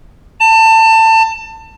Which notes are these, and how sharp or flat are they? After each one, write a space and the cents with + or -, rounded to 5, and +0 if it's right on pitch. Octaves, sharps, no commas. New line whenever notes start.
A5 +25